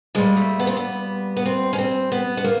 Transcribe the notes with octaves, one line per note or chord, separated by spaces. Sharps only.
A#2 G3 G#3
A3
B3
C4
B3
B3
C4
C#4
C4
B3
B3
A#3